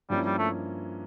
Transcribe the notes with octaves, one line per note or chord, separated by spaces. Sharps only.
G2 F3 G3 A#3 C#4 E4
G3
A3